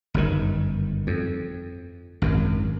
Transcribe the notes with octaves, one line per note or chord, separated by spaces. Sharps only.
G1 F#2 D#3
F2
G#1 F#2